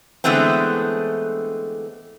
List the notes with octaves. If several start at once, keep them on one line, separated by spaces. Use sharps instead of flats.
D3 E3 G#3 A3 B3 C4